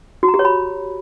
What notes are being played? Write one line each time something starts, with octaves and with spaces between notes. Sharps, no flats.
F#4
A#5
G4
C#5
B5